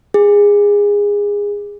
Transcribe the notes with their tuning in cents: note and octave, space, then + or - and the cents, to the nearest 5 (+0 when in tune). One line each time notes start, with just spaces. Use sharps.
G#4 -20